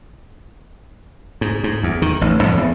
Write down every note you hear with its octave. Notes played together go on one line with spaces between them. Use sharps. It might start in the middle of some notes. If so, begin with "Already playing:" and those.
G#2
G#2
E2
D#3
A1
F2
E2